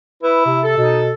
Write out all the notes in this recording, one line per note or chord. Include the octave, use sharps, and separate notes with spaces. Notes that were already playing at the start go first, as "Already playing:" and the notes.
E4 B4
C3
A4
B2 D#4